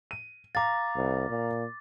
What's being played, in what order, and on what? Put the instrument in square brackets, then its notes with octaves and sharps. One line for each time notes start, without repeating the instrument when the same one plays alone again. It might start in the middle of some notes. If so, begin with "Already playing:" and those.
[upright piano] D#7
[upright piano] F5 A#5 [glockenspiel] D6 A6
[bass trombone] C2
A#2